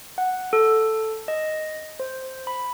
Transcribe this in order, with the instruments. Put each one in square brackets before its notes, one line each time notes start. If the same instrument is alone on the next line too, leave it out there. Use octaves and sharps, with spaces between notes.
[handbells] F#5
A4
D#5
C5
B5